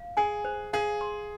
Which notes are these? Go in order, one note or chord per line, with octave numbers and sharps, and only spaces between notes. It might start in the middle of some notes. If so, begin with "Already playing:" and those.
Already playing: F5
G#4 G#5
C5
G#4 F5
C6